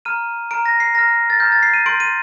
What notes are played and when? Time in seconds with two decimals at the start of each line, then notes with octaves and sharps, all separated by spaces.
0.05 A#5 F6 D#7
0.51 A#5 F6 D7
0.66 A#6
0.80 C7
0.95 A#5 F6 A#6
1.30 A6
1.40 A#5 F6 G6
1.52 A6
1.63 C7
1.74 D#7
1.86 C6 G6 D7
2.00 D#7